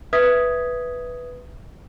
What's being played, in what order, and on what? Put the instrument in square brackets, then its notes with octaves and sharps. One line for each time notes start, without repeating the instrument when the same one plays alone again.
[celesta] B4 E5 D#6 G#6 B6